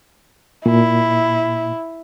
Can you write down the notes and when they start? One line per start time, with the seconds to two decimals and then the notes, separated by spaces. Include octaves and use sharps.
0.66 A#2 E4